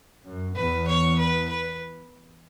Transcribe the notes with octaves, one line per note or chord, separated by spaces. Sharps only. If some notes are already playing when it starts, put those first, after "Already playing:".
F#2
E2 B4
C#5
B4
B4